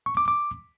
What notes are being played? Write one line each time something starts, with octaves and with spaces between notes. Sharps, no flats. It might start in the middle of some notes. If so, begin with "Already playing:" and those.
C#6
D6
D6